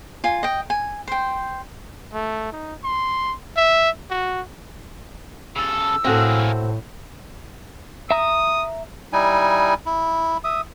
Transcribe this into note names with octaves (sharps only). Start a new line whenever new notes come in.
F4 G#5
D#5 G5
G#5
C5 G5
A3
D#4
C6
E5
F#4
C#3 A4 E6
A2 A#3 C4 F#4 G#4 A4
E5 A#5 D#6
G3 D#4 E4 G#5
E4
E5 D#6